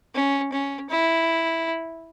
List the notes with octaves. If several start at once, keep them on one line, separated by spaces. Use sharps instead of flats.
C#4
C#4
E4